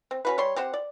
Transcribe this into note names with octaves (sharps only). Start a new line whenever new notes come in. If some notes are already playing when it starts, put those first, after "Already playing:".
C4
C#4 F#4 B4
G3 C#5 C6
C4 G4 C5 F#5
D5